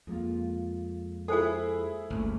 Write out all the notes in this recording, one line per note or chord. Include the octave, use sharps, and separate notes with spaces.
F2 G#3 A#3 F4
E4 G#4 A4 C5 G#5
G1 D2 A#2 A3 C#4